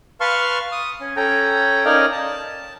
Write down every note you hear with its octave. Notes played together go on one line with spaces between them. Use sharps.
B4 F5 A5 C6 C#6 F6
D#6
C#4
C#4 A4 G5 A#5
C#4 D#4 A#4 D5 D#5 F5
A5